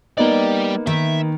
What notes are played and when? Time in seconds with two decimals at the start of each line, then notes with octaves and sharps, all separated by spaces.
0.18 G3 A#3 B3 D#4 D5
0.87 D#3 E5